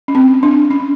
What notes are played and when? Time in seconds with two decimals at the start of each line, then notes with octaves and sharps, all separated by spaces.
0.08 C#4
0.15 C4
0.43 D4
0.70 C#4